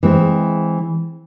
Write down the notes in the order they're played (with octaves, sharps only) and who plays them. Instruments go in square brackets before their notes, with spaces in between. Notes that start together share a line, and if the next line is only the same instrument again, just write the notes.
[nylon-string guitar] E3 G#3 C4